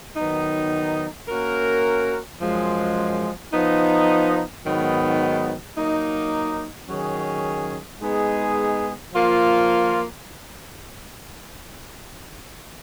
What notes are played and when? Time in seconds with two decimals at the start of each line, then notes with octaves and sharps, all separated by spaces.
0.17 D#3 F#3 B3 D#4
1.28 A#3 C#4 F#4 A#4
2.41 F#2 F3 G#3
3.53 F3 B3 D#4
4.65 G#2 D#3 F#3 B3
5.77 F#3 A#3 D#4
6.89 D#3 F#3 C#4 G#4
8.01 G#3 B3 D#4 G#4
9.13 F3 A#3 F4